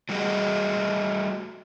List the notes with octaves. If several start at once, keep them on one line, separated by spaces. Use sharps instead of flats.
F#3 G3 A3 F#4 G#4 D#5